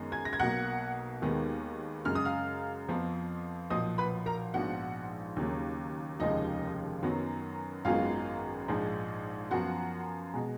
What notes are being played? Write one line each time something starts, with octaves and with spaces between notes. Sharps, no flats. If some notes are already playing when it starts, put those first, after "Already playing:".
Already playing: F#2 D#3 G#3 B3
G#5 G#6
A#6
G#6
B1 B2 A#3 F#5 F#6
D#2 D#3 G#3 B3
F#2 C#3 G#3 F6
D#6
F5 F6
F2 F3 B3
B1 A#2 F3 D#5 D#6
B4 B5
A#4 A#5
A#1 G#2 F3 B3 F#4 F#5
D#2 C#3 F#3 A#3
F1 D#2 C#3 F3 G#3 D#4 D#5
F#2 D#3 F#3 B3
G#1 F#2 D#3 G#3 B3 F4 F5
A#1 G#2 F3 G#3
F#2 F3 B3 F#4 F#5
B2 G#3